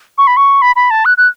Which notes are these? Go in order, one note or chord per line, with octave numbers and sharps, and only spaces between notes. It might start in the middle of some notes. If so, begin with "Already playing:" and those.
C#6
B5
C#6
B5
B5
A5
F#6
F#6